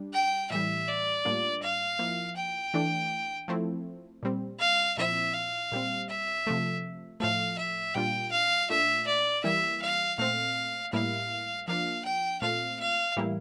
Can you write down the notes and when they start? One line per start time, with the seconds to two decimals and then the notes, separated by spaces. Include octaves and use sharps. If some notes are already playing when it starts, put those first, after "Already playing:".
Already playing: G3 D4
0.13 G5
0.51 A2 E3 G3 E5
0.88 D5
1.25 A2 G3 A#3 D4 F4
1.62 F5
1.99 F3 A#3 E4
2.36 G5
2.74 E3 A3 D4
3.48 F3 A3 C4 E4
4.23 A#2 G3 C4
4.59 F5
4.97 A#2 F3 C4 E4 E5
5.34 F5
5.72 A#2 G3 C4
6.09 E5
6.47 C3 F3 A3
7.20 A2 F3 A3 F5
7.58 E5
7.95 A#2 G3 A#3 D4 F4 G5
8.32 F5
8.70 A#2 A3 D4 F4 E5
9.07 D5
9.43 E3 G3 A#3 E4 E5
9.81 F5
10.18 A#2 A3 C4 F5
10.93 A2 G3 A#3 E4 F5
11.67 F3 A#3 D4 F4 F5
12.05 G5
12.42 A#2 A3 C4 F4 F5
12.80 F5
13.16 A2 E3 G3 A#3 E4